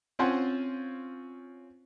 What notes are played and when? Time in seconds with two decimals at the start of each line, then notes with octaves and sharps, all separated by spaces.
0.19 C4 C#4 F4 C5 F#5 G#5